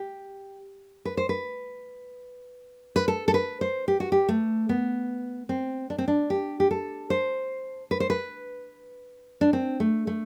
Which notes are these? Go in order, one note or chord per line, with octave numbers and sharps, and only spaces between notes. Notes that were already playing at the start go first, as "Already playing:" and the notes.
Already playing: G4
B4
C5
B4
B4
A4
A4
B4
C5
G4
F#4
G4
A3
B3
C4
D4
C4
D4
G4
G4
A4
C5
B4
C5
B4
D4
C4
A3
A3